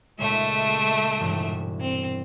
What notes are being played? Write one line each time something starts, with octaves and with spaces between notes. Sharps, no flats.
C#2 A#2 G#3 A3 E5
E1 G2
C4